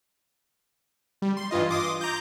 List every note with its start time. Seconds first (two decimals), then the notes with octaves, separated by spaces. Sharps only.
1.22 G3
1.37 C6
1.51 G2 E3 F4 D#5
1.69 C6 D6 D#6
2.01 A#5 D6 G6